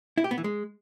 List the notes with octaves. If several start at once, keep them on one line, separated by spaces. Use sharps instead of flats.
E4
G4
B3
E3
G#3